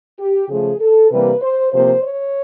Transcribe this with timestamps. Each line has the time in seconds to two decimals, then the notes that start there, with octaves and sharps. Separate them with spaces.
0.19 G4
0.49 C#3 F3 A3 G#4
0.79 A4
1.10 C3 E3 G3 A#3 B4
1.41 C5
1.71 C3 F3 A#3 C5
2.02 C#5